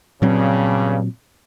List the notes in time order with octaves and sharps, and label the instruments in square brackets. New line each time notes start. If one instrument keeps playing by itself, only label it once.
[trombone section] G2 C#3 [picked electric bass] A#2 F#3 C4